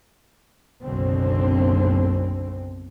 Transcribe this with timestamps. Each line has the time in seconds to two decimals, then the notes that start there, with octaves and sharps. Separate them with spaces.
0.82 F#1 B1 F#2 B2 D3 C4